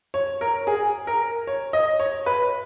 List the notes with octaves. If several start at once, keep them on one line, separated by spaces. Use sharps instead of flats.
C#5
A#4
G#4
A#4
C#5
D#5
C#5
B4